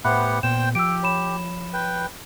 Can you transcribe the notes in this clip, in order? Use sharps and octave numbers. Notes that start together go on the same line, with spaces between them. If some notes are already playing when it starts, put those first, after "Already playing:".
A2 B3 G4 C5 E5 F#5 B5 F#6
A#2 B3 C5 G5 E7
F3 G4 E6 D7
C#5 B5 E7
B4 G5